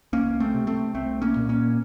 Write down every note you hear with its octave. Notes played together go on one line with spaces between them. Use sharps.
C#2 A#3 C#4
A3 C4
C3
A3 C4
C2 A3 C4
A#3 C#4
A#2
A#3 C#4